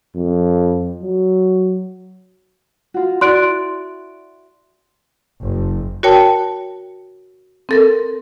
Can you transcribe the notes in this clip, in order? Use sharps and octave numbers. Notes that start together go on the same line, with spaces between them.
F2
F#3
F4 F#4
E4 F#4 D5 C6 F#6 D7
F#1
F#4 A#4 C#5 G5 A5
C4 A4 A#4